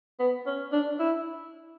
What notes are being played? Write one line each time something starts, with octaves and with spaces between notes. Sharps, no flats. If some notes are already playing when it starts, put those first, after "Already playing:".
B3
C#4
D4
E4